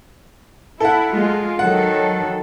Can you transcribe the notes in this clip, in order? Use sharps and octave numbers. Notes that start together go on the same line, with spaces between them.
E4 A4 F#5
G#3 F4
D#3 F#3 A4 F#5